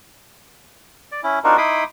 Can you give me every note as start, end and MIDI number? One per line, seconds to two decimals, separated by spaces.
1.12 1.21 74
1.23 1.39 61
1.23 1.39 64
1.44 1.57 60
1.44 1.57 62
1.44 1.57 63
1.44 1.57 65
1.44 1.57 66
1.44 1.57 70
1.58 1.84 63
1.58 1.84 64
1.58 1.84 83
1.58 1.84 84
1.58 1.84 86
1.58 1.84 87